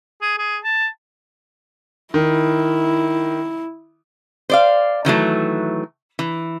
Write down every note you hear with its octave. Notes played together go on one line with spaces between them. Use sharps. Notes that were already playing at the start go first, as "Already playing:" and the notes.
G#4
G#4
A5
D#3 E4
C5 D5 F5
D#3 E3 F#3 A3
E3